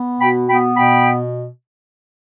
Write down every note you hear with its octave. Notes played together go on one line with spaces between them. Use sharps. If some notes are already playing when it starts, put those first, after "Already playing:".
Already playing: B3
B2 G5 B5
B3 G5 B5
B2 G5 B5